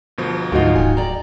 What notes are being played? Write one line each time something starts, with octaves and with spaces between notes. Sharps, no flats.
G1 B2 F3
D2 G#2 D#4 F4 F#4 D#5
D1 G5 G#5
D5 A#5